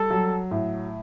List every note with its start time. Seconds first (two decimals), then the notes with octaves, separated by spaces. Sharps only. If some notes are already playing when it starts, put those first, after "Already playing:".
Already playing: G3 A4
0.10 F#3
0.51 A2